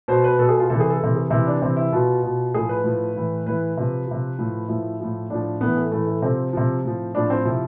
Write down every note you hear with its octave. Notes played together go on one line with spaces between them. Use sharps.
B2 C5
B4
B2 A4
G#4
F4
C3 E3 A4
G#4
A4
C3 E3
G#4
C3 E3 E4
D4
C3 E3 C4
E4
B2 F4
B2
A2 F3 G#4
B4
A2 F3
A2 E3
A2 E3 B4
C3 F3
C3 F3
A2 F3
A2 F3 E4
A2 F3
A2 F3 D4
A2 E3 B3
A3
A2 E3 A3
A3
C3 F3 C4
C3 F3
A2 F3
A2 F3 D4
C4
C3 F3 E4